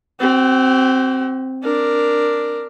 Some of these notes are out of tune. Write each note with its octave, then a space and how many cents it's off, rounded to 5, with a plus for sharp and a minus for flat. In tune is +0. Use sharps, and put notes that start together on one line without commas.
C4 +0 F#4 +40
D4 +0 A#4 +0